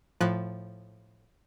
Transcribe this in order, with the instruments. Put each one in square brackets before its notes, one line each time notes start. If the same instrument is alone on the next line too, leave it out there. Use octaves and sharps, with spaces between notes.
[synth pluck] A2 F3 F#6